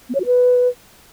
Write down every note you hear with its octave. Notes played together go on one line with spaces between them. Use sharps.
B3
C#5
F#4
B4